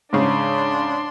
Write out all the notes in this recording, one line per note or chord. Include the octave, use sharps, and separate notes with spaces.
G#2 C#3 D4 C6